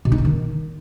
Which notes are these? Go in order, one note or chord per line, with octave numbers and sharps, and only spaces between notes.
B2
D#4
D3
D#3